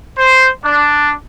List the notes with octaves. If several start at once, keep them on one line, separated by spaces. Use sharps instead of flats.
C5
D4